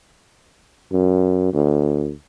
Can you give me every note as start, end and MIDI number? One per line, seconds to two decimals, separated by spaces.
0.92 1.49 42
1.53 2.11 38